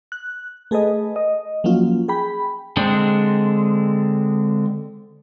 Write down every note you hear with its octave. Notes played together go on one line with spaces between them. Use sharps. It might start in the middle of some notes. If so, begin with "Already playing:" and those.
F#6
A3 G#4 A4 B4 D#5
D#5
F3 F#3 A#3 C#4 F4
G#4 G5 B5
D3 G#3 C4 D4